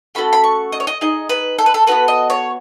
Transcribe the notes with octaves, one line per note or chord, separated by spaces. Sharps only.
A3 C#4 F#4 A4 B5
B5
C#6
D#5
C#5
D#5
D#4 G#4 D#5
B4
A4
B4
A4
B3 D#4 F#4 A4 B4
D#5
C#5